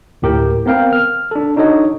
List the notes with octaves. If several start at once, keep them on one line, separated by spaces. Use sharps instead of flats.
D2 A2 G4 A#4 G5
B3 C4 A#4 F5 G5
F6
D4 A4
D4 D#4 F#4 A4 C#5 D#5